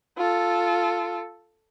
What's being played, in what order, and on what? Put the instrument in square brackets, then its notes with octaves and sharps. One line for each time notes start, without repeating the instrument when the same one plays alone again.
[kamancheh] F4 A4